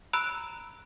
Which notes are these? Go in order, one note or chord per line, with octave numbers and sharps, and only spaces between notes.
A#5 B5 E6 F#6 D7